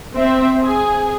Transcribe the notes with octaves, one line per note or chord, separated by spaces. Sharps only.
C4 E5
G#4